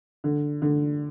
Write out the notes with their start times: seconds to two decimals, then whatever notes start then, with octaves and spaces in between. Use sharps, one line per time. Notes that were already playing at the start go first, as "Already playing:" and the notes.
0.24 D3
0.62 D3